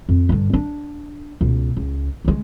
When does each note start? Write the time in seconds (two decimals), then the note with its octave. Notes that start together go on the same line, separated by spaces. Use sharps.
0.09 F2
0.29 G2 D3
0.53 D4
1.41 C#2 B2
1.77 C#2
2.25 C#3 G#3